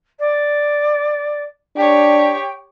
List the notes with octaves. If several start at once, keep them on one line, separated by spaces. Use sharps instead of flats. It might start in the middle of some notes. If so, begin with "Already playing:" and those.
D5
D4 G4 C#5 G5